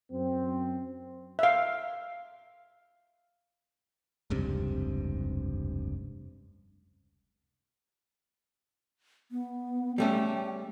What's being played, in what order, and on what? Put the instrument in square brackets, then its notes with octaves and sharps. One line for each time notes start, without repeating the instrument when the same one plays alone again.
[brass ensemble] F#2 C4
[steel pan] E5 F5
[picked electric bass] F1 C#2 G2 C3
[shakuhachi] B3
[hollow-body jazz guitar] G3 A3 C#4 [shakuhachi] G5